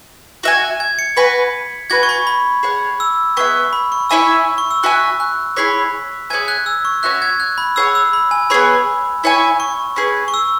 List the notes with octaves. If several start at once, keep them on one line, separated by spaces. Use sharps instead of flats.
F#4 E5 G#5
G#6
C#7
F#4 B4 G#5 B6
F#4 B4 G#5 G#6
C#6
B5
B5
G#4 C#5 F#5
E6
B3 G#4 E5 C#6
B5
C#6
E4 C#5 E5 G#5 E6
C#6
E6
F#4 E5 G#5 F#6
F#6
E4 G#4 C#5 B6
G#4 C#5 E5 G#5 G#6
F#6
E6
C#6
C#4 F#4 C#5 E5 F#6
G#6
F#6
B5
G#4 C#5 F#5 E6
E6
B5
G#5
B3 G#4 C#5 B5
E4 C#5 E5 G#5
C#6
C#4 G#4 B4
C#6
E6